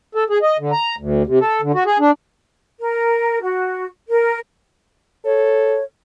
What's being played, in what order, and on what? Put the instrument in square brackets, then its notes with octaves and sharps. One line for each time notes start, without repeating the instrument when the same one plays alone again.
[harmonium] A4
G#4
D#5
D3
A#5
D2
C3
A4
D3
F#4
G#4
D4
[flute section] A#4
F#4
A#4
[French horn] A4 [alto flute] C#5